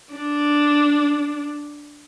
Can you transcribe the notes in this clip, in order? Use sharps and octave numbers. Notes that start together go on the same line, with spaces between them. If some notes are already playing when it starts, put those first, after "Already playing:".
D4